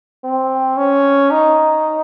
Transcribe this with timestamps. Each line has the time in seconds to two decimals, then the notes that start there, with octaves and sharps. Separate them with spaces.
0.24 C4
0.77 C#4
1.31 D#4